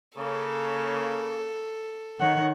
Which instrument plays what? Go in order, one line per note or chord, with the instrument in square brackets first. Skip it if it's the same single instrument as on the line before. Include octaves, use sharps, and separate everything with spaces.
[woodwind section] C#3 A#3 [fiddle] A4
[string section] D#3 [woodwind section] C#5 [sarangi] F#5